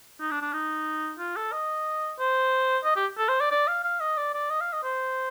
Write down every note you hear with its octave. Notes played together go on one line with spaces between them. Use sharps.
D#4
D4
D4
D#4
F4
A4
D#5
C5
D#5
G4
A4
C5
D5
D5
F5
F5
D#5
D5
D5
D#5
F5
D#5
C5